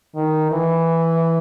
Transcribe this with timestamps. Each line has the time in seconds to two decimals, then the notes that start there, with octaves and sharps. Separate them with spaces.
0.15 D#3
0.52 E3